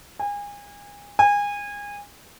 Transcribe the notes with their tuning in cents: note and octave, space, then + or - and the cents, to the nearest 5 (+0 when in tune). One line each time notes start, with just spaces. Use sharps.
G#5 -30
G#5 -25